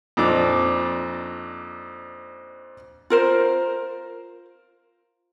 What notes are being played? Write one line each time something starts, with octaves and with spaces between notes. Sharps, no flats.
F2 A#2 D4 D#4 D6
F4 A#4 C5